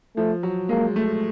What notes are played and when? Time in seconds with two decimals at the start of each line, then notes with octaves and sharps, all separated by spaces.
0.17 F3 A3
0.43 F#3
0.69 G#3 A#3
0.96 A3